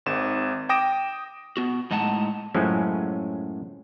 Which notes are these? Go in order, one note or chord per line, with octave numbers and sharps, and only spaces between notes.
G#1 G#2 E7
G5 D6 D#6 A#6 D7 E7
B3 F#4
A2 G#3 D#4 F#5 A5
F#2 A2 F3 F#3 G#3 C#4